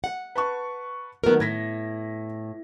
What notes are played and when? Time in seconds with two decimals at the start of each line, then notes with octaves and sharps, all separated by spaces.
0.04 F#5
0.35 B4 A5 C#6
1.24 D#3 F#3 A3 B3 A#4
1.40 A2 G#6 A#6 B6